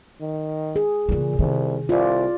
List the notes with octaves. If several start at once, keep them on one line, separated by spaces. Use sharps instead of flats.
D#3
G#4
A#2 C#3 E3
C2 C3 D#3
C2 F4 D5